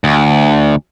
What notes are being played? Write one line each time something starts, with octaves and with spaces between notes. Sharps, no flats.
D2